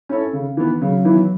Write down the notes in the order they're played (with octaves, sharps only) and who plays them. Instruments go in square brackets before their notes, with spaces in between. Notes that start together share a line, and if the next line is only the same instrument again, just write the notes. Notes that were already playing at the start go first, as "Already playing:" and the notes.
[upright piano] C#4 E4 A4 C#5
C#3
E3 B3
[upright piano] C#3 [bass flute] F#3
[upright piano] E3 B3 E4